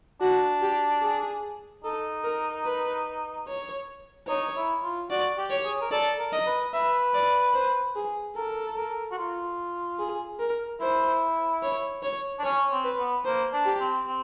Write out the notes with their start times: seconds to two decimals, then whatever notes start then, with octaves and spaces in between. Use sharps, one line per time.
0.21 D4 F#4
0.62 G4
1.02 G#4
1.84 D#4 A4
2.24 A#4
2.65 B4
3.48 C#5
4.28 D#4 C#5
4.56 E4
4.83 F4
5.10 F#4 D5
5.38 G4
5.51 C#5
5.65 G#4
5.81 A#4
5.92 A4 D5
6.19 A#4
6.33 D#5
6.46 B4
6.73 B4 E5
7.14 D5
7.54 C5
7.96 G#4
8.36 A4 A#4
8.76 A#4
9.11 F#4
9.17 F4
9.99 G#4
10.40 A#4
10.81 E4 C5
11.63 C#5
12.03 C#5
12.38 D4
12.44 C#4 C#5
12.71 C4
12.84 B4
12.98 B3
13.25 A#3 C5
13.53 D4
13.66 G4
13.80 C4
14.07 C4